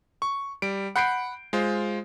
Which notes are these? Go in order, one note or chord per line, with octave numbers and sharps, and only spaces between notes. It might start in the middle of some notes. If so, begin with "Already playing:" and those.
C#6
G3 D7
F#5 B5 G6 C7 D7
G#3 F4 C5